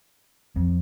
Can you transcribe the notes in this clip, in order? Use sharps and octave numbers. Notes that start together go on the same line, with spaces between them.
F2